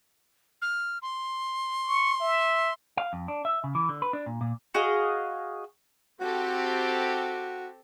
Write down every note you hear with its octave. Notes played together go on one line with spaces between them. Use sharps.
F6
C6
C#6
E5
F5
F2
D4
E5
C#3
E3
D3
B4
D4
A#2
A#2
F#4 G#4 D#5 F5
C4 F#4 G4 A4